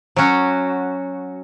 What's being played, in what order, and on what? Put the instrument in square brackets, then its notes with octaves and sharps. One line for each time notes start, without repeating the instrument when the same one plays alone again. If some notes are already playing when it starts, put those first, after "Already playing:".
[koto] F#3 C#4 F#4